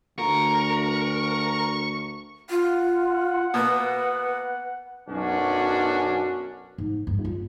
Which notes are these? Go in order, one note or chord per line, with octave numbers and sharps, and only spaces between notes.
D2 A#4 C#6
F4 F#5
B2 A#3 B3 B4
B1 F#2 C#4 D4 F#4
G#2
G2
F4